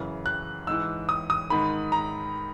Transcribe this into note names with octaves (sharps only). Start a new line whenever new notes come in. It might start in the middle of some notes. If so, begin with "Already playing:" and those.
Already playing: F#2 C#3 E3
F#6
G#2 E3 E6
D#6
D#6
G#2 D#3 B5
A#5